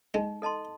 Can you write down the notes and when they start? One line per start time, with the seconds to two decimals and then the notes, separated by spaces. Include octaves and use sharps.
0.14 G#3 D#4
0.42 A4 D#5 A5 C6